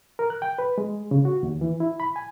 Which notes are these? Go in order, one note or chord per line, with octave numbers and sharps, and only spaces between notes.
A#4
F#6
G5
B4
G#3
C#3
F#4
D#2
E3
E4
B5
G#5